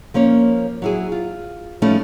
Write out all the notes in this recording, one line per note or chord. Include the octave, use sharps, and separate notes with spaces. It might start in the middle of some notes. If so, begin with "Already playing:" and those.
F3 A#3 C#4 C#5
F#3 E4 G#4
F4
F3 G3 A3 C#4 D#4 E4